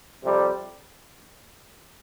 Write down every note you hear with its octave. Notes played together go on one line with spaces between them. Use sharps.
F2 C3 G3